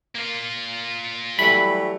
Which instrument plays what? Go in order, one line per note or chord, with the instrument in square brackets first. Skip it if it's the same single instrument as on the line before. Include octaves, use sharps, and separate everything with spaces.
[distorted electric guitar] A#3 F4
[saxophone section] E3 F#3 A3 [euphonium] G3 [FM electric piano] B5